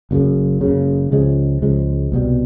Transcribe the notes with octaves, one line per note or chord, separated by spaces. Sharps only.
F#1 F#2 C#3
F#1 F#2 C#3
C#2 C#3 F3 G#3
C#2 C#3 F3 G#3
C2 B2 G3